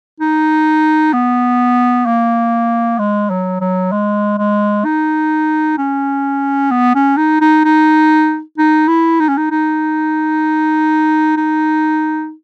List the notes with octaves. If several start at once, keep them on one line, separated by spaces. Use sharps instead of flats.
D#4
B3
A#3
G#3
F#3
F#3
G#3
G#3
D#4
C#4
B3
C#4
D#4
D#4
D#4
D#4
E4
D#4
C#4
D#4
D#4
D#4